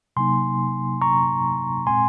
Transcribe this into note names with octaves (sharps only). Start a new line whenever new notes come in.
C3 F#3 A#3 D#4 G#5 C6
A#5 C#6
A#2 G#3 C4 G#5 C6